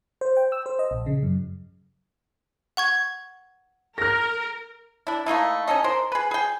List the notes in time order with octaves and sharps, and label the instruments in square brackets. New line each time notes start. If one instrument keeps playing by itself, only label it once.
[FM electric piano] C5
G5
E6
C5
D#5
A#1
C#3
F#2
[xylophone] F#5 C#6 G#6
[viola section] A#4 [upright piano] F6 A#6
[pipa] D4 E4
A3 A#3 D#4 E4
C#4 D#4 A4 D#5
A#4 C5 C6
G#4 B4
G#4 G5